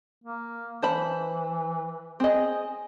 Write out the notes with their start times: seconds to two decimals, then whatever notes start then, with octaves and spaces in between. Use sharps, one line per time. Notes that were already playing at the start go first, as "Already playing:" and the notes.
0.24 A#3
0.83 E3 C5 A5 B5
2.20 C4 G#4 D#5